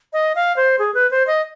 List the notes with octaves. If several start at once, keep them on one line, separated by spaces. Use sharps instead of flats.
D#5
F5
C5
G#4
B4
C5
D#5